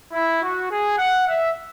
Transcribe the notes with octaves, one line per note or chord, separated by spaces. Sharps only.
E4
F#4
G#4
F#5
E5